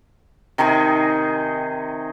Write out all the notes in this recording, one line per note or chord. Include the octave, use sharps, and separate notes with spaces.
C3 D#3 D#4 G#4